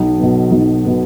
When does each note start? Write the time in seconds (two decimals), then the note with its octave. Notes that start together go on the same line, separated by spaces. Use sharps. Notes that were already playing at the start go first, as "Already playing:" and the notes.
Already playing: B1
0.18 B2 B3
0.51 B1
0.84 B2 B3